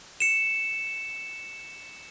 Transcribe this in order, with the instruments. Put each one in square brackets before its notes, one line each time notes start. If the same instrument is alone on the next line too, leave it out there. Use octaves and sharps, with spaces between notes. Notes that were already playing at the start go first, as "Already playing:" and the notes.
[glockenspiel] C#7 E7